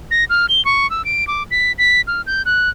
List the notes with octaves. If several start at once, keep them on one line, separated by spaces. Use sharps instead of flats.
A#6
F6
G7
C#6
E6
D7
D6
B6
B6
F6
G6
F#6